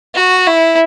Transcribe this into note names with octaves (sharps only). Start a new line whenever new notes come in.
F#4
E4